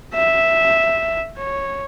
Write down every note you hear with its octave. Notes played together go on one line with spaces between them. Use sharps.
E5
C#5